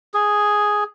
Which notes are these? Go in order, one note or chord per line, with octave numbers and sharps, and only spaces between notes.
G#4